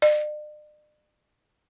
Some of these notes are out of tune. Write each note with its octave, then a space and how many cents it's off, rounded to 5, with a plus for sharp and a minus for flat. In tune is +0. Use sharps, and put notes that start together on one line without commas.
D5 +45